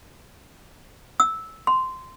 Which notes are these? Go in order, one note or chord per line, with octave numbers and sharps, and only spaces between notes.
E6
C6